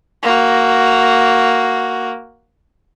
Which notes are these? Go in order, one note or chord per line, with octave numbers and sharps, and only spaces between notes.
A#3 F#4